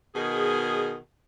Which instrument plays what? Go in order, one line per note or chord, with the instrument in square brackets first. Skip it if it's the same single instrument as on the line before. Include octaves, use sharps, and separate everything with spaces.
[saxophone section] B2 D#3 G#4